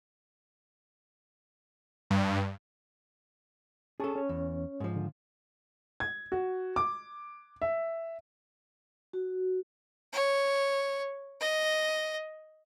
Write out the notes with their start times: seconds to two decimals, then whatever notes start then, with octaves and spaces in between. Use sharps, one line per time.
2.10 G2
4.00 C#4 G#4 A4 A5 C#6
4.15 C#4 C#5
4.29 E2
4.80 G#2 F3
4.96 D3
6.00 G#6
6.32 F#4
6.76 D6
7.62 E5
9.13 F#4
10.13 C#5
11.41 D#5